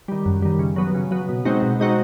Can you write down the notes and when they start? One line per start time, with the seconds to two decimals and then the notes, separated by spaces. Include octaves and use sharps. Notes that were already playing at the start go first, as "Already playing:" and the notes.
0.08 D#3 G3
0.26 F#2
0.42 D#3 G3
0.59 C#3
0.76 F#3 B3
0.95 C#3
1.11 F#3 B3
1.29 B2
1.45 G#3 C4 D#4 F#4
1.62 B2
1.80 G#3 C4 D#4 F#4